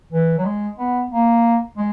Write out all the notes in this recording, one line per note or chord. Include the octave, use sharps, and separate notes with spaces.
E3
F#3
G#3
B3
A#3
G#3